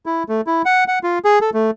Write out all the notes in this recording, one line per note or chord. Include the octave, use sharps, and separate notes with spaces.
E4
A3
E4
F#5
F#5
F4
G#4
A4
A3